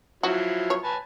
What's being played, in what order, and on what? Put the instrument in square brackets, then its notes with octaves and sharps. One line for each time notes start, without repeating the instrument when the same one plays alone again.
[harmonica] F3 F#3 E4 [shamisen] F#4
[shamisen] C#5
[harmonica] B4 G#5 A5